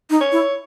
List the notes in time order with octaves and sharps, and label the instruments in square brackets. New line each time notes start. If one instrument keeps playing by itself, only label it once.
[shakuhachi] D#4
[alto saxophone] C#5
[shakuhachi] E4